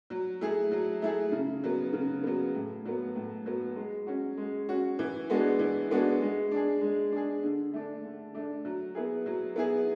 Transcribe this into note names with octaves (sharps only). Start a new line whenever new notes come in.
F#3
A3 E4 G#4
F#3
A3 E4 G#4
C#3
F#3 B3
C#3
F#3 B3
A2
F#3 B3
A2
F#3 B3
G#3
C#4 F#4
G#3
C#4 F#4
E3
G#3 B3 D4 F#4
E3
G#3 B3 D4 F#4
G#3
D4 G#4
G#3
D4 G#4
D3
A3 D4
D3
A3 D4
F#3
B3 E4 G#4
F#3
B3 E4 G#4